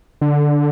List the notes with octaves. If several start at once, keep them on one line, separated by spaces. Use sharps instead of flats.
D3